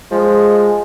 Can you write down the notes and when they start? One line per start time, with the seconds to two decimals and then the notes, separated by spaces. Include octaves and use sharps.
0.11 F3 G#3